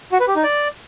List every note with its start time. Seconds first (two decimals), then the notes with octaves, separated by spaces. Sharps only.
0.12 F#4
0.20 B4
0.28 G4
0.36 D#4
0.44 D5